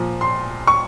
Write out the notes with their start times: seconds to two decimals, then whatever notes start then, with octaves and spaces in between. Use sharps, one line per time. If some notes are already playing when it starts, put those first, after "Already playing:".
Already playing: A#2 F3
0.21 C6
0.67 C#6